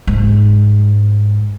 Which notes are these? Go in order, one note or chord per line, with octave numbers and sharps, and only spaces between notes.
G#2